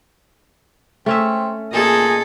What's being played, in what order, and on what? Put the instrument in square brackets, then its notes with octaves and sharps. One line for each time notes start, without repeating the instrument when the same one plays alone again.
[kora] A3 C#4 E5 [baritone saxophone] C4
[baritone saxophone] A#2 [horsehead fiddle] G#4 D#5 [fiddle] A4